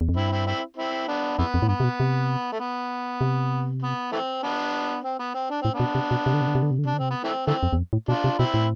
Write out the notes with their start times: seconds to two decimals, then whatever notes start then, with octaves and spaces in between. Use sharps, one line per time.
0.01 E2
0.09 F2
0.16 G2 C4 E4
0.31 C4 E4
0.47 C4 E4
0.77 C4 E4
1.08 B3 D4
1.38 F2 E3 B3
1.54 F2
1.62 A2
1.69 G2 B3
1.80 C3
1.84 B2
2.00 C3
2.52 A3
2.60 B3
3.21 C3
3.83 B3
4.12 E3 A3 C4
4.43 B3 D4
5.04 C4
5.19 B3
5.34 C4
5.50 D4
5.62 A2 C4
5.74 B3 D4
5.80 B2
5.95 C3
6.11 B2
6.26 C3
6.34 D3
6.41 C3
6.48 D3
6.55 C3
6.63 D3
6.71 C3
6.79 D3
6.85 C3 D4
6.94 D3
6.99 C3 C4
7.11 B3
7.24 E3 A3 C4
7.47 D3 E3 A3 C4
7.63 F2
7.73 E2
7.78 F2
7.93 A2
8.08 B2 D4 F4
8.24 C3
8.39 B2 C4 E4
8.54 A2